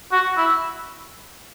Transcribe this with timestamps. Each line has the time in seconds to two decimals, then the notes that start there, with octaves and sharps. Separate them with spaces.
0.12 F#4
0.37 E4